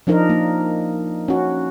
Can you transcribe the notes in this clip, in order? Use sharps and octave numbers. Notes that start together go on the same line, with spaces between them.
F3 D4 D#4 A#4
A#3
C#4 F#4